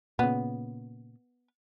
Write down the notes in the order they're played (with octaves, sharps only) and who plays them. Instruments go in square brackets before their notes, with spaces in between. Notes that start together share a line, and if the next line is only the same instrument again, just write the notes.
[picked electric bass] A#2 C#3 [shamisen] B3